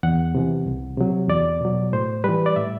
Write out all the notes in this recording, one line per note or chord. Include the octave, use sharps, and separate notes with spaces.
E2 F#5
C3 E3
C2
C3 F#3
E2 D5
B2 F#3
A2 C5
E3 G3 B4
D5
A2 E5